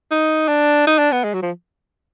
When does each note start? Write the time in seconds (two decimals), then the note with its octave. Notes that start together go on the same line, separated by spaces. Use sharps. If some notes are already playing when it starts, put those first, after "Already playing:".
0.11 D#4
0.48 D4
0.87 D#4
0.98 D4
1.12 B3
1.24 G#3
1.34 F#3
1.42 F3